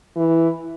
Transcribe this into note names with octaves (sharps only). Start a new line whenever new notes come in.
E3